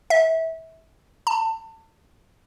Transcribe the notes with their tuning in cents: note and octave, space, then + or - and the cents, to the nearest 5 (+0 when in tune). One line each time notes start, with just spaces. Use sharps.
E5 -25
A5 +30